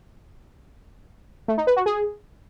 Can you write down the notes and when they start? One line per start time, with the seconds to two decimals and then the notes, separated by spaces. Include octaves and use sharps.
1.48 A3
1.58 D#4
1.67 B4
1.76 F#4
1.86 G#4